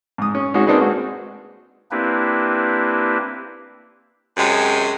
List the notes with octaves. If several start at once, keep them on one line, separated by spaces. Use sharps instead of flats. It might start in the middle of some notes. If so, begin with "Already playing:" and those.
G#2 D#6
C#4
G#3 C#4 D#4 F#4
A#3 C4 D4 D#4 G#4 B4
G#3 F#4
A#3 C4 D4 E4 G4 B4
F#2 C3 G#3